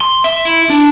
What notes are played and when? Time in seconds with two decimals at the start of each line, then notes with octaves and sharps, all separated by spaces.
0.01 C6
0.24 E5
0.45 E4
0.70 D4